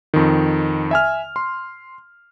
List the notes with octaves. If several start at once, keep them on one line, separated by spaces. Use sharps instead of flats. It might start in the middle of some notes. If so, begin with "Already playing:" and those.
F2 D#3
E5 G#5 F6
C6